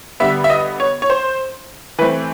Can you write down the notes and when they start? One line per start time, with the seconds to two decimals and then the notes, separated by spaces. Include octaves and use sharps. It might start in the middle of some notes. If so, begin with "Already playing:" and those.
0.20 D3 G3 B3 E5
0.44 E5
0.50 D#5
0.80 C#5
1.02 C#5
1.10 C5
1.99 E3 B4
2.02 A3 C4